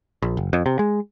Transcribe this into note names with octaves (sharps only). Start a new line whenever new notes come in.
A#1
F#1
F2
C3
G#3